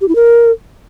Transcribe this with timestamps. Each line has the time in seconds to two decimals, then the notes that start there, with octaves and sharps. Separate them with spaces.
0.01 G4
0.08 E4
0.15 A#4